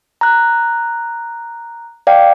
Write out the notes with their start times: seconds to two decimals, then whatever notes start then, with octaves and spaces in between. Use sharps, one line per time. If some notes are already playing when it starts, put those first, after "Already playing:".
0.21 A#5 F#6
2.07 D5 F5 G5